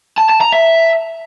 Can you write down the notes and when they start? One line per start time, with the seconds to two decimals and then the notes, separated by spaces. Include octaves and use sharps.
0.18 A5
0.29 A5
0.41 A#5
0.53 E5